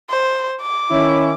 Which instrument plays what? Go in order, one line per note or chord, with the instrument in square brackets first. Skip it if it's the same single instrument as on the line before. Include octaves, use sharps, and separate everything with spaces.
[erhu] C5
D6
[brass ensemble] D#3 C#4 E4